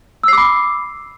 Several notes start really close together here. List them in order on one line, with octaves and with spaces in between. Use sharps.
E6 C7 D6 B5